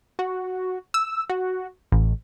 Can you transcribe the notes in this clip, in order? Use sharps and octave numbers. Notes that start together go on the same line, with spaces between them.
F#4
E6
F#4
A1